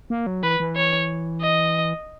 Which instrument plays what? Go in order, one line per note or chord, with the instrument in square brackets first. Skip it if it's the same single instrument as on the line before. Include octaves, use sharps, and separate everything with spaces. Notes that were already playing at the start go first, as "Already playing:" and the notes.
[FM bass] A#3
F#3
[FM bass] E3 [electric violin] B4
[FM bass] E3
[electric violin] C#5
D#5